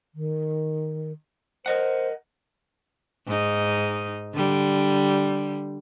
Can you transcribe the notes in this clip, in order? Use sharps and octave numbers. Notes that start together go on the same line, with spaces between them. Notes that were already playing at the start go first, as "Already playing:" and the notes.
D#3
A#4 C5 D#5 F#5
G#2 D#4
D3 G3